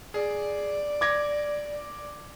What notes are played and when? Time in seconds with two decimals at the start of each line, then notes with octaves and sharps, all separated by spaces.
0.14 G#4 D5
1.01 D6 G#6 A#6